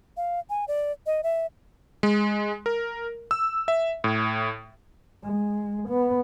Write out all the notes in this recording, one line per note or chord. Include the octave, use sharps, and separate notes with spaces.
F5
G#5
D5
D#5
E5
G#3
A#4
E6
E5
A2
G#3
B3